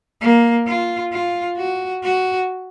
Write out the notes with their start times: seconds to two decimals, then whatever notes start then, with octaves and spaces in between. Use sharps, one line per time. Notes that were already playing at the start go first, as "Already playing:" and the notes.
0.21 A#3
0.67 F4
1.12 F4
1.57 F#4
2.03 F#4